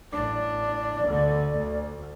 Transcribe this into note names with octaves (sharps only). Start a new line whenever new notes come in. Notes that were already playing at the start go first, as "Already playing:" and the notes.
A1 D4 D5
D2 D3
D2